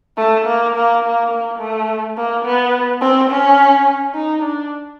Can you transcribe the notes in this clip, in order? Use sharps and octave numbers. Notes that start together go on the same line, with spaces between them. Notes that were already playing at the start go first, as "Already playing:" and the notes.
A3
A#3
A#3
A#3
A#3
A3
A#3
B3
C4
C#4
D#4
D4